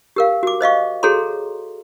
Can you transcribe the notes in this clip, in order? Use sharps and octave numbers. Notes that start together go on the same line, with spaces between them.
G4 A#4 F5
F#4 D6
C5 D#5 F5 C#6
F#4 G#4 A4 C#5 A#5 C6